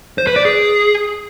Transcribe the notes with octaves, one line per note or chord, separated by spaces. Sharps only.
C5
B4
D5
G#4